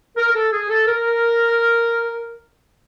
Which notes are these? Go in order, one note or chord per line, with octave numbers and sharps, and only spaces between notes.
A#4
A#4
A4
G#4
A4
A#4